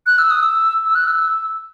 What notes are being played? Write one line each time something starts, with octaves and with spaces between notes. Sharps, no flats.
F#6
E6
D#6
E6
E6
F#6
E6